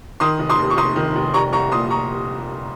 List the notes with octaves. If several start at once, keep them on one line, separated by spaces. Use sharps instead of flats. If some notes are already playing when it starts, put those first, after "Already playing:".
D#3 C6 D#6
F1
C6 D#6
D#2
C#6
F1 C6 D#6
D#3
F1
G3 A#5 C#6
C2 A#5 C#6
A#2 C6 D#6
A#5 C#6